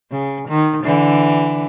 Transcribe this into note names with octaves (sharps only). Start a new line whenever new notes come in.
C#3
D#3
D3 E3